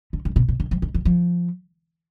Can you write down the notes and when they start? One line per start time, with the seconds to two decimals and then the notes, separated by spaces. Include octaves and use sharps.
0.13 D3
0.25 D3
0.36 B2
0.48 B2
0.60 D3
0.71 F3
0.82 D3
0.94 E3
1.05 F3